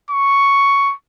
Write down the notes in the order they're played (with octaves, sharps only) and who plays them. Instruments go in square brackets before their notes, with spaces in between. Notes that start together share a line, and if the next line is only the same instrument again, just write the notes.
[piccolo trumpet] C#6